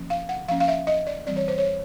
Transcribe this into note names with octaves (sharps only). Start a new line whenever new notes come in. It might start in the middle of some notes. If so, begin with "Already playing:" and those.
Already playing: F3 A#3 C#4
F5
F#5
F3 A#3 C#4 F5
F5
E5
D#5
D5
E3 G3 C4 D5
C#5
C5
C#5